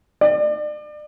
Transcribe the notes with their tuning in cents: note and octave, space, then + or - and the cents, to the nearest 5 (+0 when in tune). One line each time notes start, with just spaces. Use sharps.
D5 +35